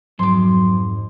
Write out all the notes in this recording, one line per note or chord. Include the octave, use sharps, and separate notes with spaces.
F2 G#2 F#3 C6 D6